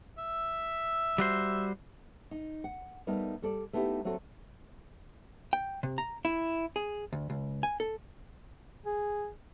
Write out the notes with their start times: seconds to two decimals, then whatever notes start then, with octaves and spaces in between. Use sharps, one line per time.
0.19 E5
1.18 G3 F#4 C5
2.31 D#4
2.64 F#5
3.07 G3 A3 B3 D#4 A#4 D#5
3.42 G3 A4 D5
3.73 A3 B3 D#4 E4 F#4 G4
4.05 F#3 A3 C4 F#4 A4
5.53 G5
5.83 C3
5.98 A#5
6.25 E4
6.76 G#4
7.13 D2
7.30 C#2
7.63 G#5
7.80 A4
8.86 G#4